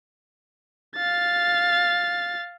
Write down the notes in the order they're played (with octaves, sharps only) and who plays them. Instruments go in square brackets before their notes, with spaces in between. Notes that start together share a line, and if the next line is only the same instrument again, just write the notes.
[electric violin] F5 A6